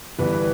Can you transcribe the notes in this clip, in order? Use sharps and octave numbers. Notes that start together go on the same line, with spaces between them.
G1 G2 E3 B3 B4